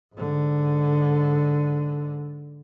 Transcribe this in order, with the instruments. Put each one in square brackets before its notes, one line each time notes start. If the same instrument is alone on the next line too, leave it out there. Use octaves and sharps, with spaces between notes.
[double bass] G#2 D3